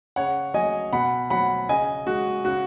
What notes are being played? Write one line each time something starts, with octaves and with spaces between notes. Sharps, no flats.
C#3 C#5 F#5
F#3 D#5 G#5
B2 F#5 B5
F#3 F#5 B5
C#3 D#5 G#5
G#3 F#4
C#3 F#4